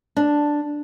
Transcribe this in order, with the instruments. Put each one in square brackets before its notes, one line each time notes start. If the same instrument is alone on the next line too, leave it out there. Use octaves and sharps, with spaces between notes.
[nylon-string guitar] D4